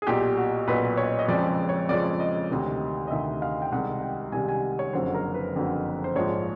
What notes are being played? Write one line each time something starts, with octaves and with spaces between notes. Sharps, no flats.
G#4
B1 A#2 F#3 G4
F#4
B1 A#2 F#3 B4
C#5
D#5
F2 C#3 F3 G#3 D5
C#5
F2 C#3 F3 G#3 D5
D#5
D2 C3 D#3
D#5
D2 C3 D#3 E5
F5
G5
C2 C3 D#3 G#3 F#5
G5
C2 C3 D#3 G#3 G#5
G#5
C#5
F#1 F2 D3 F#3 C5
A#4
B4
F#1 F2 D3 F#3
C5
A#1 G#2 F3 G#3 C#5